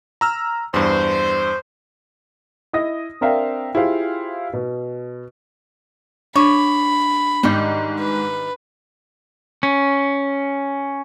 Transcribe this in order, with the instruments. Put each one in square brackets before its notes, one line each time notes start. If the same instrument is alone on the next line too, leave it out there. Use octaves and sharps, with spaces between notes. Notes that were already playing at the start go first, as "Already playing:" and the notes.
[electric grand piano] A#5 E6 F6
[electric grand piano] E2 G2 [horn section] C5
[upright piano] E4 D#5 D#6 A#6
C4 D4 A#4 E5 F5 G5
E4 F4 G4 G#4 C5 F5
B2
[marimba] D4 [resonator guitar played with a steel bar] C#5 [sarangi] B5
[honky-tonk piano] G#2 [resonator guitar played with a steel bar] D#3 G3 D#4
[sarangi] B4
[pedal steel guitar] C#4